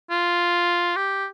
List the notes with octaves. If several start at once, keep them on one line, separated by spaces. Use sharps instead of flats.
F4
G4